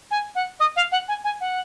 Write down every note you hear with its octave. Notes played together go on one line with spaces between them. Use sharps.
G#5
F#5
D#5
F5
F#5
G#5
G#5
F#5